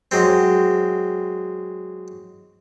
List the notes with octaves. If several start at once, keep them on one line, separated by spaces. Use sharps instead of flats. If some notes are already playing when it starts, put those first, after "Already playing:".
F#3 G#3 C4